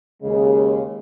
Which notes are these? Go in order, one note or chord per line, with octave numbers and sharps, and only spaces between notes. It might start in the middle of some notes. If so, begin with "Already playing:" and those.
D#2 C#3 G#3